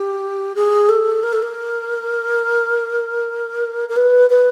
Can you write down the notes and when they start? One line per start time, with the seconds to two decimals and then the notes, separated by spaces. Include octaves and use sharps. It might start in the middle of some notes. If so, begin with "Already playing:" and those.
Already playing: G4
0.55 G#4
0.88 A4
1.23 A#4
1.32 A4
1.42 A#4
3.88 A#4
3.96 B4
4.29 B4